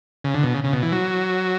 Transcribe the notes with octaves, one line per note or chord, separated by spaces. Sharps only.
C#3
D3
B2
C#3
C#3
B2
E3
F#3